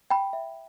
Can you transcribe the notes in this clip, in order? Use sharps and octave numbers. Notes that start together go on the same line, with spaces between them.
G5 B5
E5